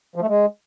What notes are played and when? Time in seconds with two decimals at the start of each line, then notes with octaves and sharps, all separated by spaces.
0.16 F3
0.22 A3
0.28 G#3